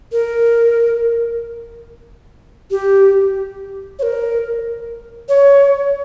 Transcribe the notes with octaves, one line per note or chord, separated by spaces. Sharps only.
A#4
G4
C#5
A#4
C#5